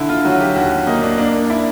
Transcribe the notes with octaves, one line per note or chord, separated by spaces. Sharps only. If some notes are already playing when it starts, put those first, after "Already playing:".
Already playing: D3 E4
F4
F#3 F#4
G4
D#2 F#4
A#3 D#4
D4
A#3 D4
D4 E4